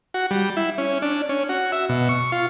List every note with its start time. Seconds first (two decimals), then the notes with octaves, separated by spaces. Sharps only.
0.14 F#4
0.31 G3
0.57 E4
0.78 C#4
1.02 D4
1.29 C#4
1.49 F#4
1.72 E5
1.89 B2
2.09 C#6
2.32 F4